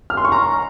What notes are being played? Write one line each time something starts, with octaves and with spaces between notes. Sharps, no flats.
F6
C6
C#6
A#5